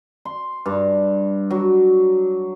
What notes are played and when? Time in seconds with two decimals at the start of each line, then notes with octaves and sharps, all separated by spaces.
0.25 C6
0.66 G2
1.51 F#3